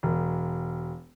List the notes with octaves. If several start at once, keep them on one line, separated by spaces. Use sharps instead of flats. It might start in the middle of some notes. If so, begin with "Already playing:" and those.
E1